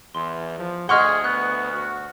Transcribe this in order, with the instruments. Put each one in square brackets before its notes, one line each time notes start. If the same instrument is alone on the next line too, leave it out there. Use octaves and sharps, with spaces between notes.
[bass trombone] E2 [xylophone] C6
[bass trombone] F3
[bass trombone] D2 [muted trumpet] G#4 [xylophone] D#5 C6 [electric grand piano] F#5 C#6 F6
[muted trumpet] B3 [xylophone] F#6
[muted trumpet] F#4